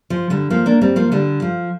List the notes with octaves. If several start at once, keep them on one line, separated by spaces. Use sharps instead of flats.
F3
D3 G3
F3 A#3
A#3 D4
G3 C4
F3 A#3
D3 G3
F3